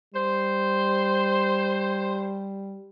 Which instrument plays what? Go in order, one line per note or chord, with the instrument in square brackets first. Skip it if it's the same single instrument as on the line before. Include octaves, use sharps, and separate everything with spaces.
[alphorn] G3 [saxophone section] C5